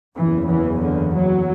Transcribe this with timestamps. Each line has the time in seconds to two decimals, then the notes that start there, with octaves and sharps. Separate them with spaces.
0.17 F#1 E2 C#3 E3
0.49 E3
0.82 D3
1.14 F#3